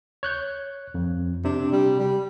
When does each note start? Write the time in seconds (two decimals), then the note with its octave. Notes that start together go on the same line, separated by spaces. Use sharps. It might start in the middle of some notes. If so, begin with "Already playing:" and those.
0.23 C#5 F#6 G6
0.94 F2
1.44 C3 D4
1.72 G3
1.99 G3